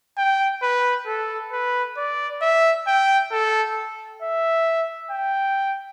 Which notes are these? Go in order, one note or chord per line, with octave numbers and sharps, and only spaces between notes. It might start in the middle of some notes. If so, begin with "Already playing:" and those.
G5
B4
A4
B4
D5
E5
G5
A4
E5
G5